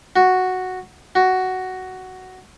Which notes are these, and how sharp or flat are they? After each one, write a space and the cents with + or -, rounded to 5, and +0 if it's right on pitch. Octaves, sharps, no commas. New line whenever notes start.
F#4 +0
F#4 +10